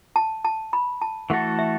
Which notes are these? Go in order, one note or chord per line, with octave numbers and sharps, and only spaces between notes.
A5
A5
B5
A5
E3 A3 F#4 A4 F#5
E5